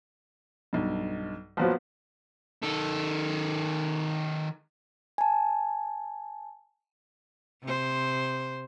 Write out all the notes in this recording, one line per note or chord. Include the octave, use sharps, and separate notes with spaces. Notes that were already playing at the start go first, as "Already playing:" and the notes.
B1 G2
A#1 F3 F#3 B3
D#3 A4
G#5 A5
C3 C5